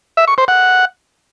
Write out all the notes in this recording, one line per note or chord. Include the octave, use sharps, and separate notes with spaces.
E5
C#6
C5
F#5